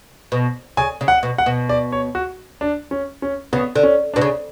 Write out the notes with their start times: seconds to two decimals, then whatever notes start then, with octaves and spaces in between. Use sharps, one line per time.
0.32 B2
0.77 C#3 G#5
1.01 C#3
1.08 F#5
1.23 B2
1.38 F#5
1.46 B2
1.69 D5
1.92 C#5
2.15 F#4
2.61 D4
2.91 C#4
3.22 C#4
3.53 C#3 B3
3.75 D3
3.83 C#4
4.14 B2 D4
4.21 C#3